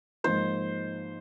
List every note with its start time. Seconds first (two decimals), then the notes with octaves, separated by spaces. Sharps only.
0.24 G#2 F3 A#3 D#4 C5